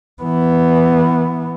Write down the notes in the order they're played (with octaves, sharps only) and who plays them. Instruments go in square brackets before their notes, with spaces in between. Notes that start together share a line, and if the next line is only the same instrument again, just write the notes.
[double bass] E3 B3